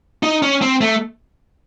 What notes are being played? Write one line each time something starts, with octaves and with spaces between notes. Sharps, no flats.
D#4
C#4
C4
A3